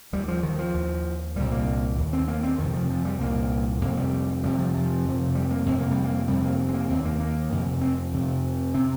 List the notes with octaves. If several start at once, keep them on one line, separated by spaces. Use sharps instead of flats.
D#2 G3
F3
D#3
F3
D#2
C2 A#2 G3
A#3
D#2
C4
A#3
C4
F2 C3 D#3
F3
F3
G3
C2 A#2 A#3
F2 C3 A#3
G3
F2 C3 G3
F3
F3
F2 C3
G3
A#3
F2 C3 C4
A#3
G3
A#3
F2 C3 G3
A#3
C4
A#3
D#2 C4
A#3
A#3
F2 C3
C4
F2 C3
C3 C4